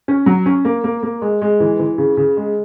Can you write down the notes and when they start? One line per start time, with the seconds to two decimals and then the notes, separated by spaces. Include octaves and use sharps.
0.08 C#4
0.26 F#3
0.46 C#4
0.65 A#3
0.84 A#3
1.03 A#3
1.22 G#3
1.41 G#3
1.60 E3
1.79 E3
1.98 C#3
2.17 C#3
2.37 G#3